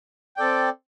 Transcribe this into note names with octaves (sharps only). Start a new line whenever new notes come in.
C4 A4 D5 G5